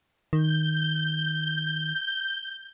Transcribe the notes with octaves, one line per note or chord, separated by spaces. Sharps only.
D#3 G6